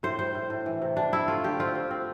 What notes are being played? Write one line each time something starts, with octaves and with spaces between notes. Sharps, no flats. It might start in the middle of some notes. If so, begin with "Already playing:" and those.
A2 C5
G3 C5
A2
A2
E3
C3
G3 D4
G3 E4
A3 F4
D3 G4
C4 F4
C4
C4